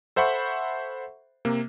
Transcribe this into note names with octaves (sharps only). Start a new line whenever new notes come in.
A4 C5 E5 F#5 B5 C#6
C3 A#3